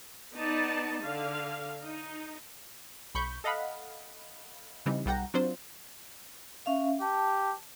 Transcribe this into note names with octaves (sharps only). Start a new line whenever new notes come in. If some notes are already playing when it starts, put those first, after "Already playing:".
B3 D#4 D5 A5
D3 F5
D#4
B1 B5 C#6 G6
A4 D#5 F5 F#5 B5
C#3 E3 G3 C4 D#4
B1 G3 F#5 G5 A#5
F#3 C4 D4 F4 C5
C#4 E5 F5
G4 A5